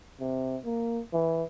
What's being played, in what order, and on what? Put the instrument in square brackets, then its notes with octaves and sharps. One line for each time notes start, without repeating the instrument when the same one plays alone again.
[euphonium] C3
A#3
E3